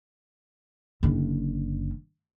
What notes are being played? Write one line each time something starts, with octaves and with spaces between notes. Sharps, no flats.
F#1 D3